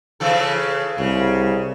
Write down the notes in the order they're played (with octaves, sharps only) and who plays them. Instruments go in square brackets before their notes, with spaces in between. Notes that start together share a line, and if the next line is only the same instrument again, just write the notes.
[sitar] C#3 E3 A4
[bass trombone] C2 [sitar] C#3